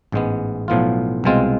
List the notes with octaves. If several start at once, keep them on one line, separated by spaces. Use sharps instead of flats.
A1 G#2 G#3 B3
B1 A2 F3 B3 F4
C2 B2 G#3 C4 F4